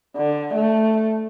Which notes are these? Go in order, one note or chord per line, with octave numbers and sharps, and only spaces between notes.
D3
A3